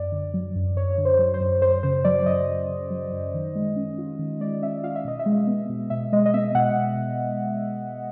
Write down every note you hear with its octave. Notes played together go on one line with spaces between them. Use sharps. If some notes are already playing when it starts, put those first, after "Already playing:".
Already playing: F#2 D5
D3
F#3
F#2
F#2 C#5
D3
C5
F#3
C5
F#2
F#2 C5
C#3 C5
F#3 D5
D5
F#2 D#5
F#2
C#3
F#3
F#2
D#3
G#3
C#4
F4
D#3
G#3 D5
C#4 E5
F4 F5
E5
B2 D#5
E5
G#3
B3
B2
B2 E5
G#3 D#5
D#5
B3 E5
B2 F#5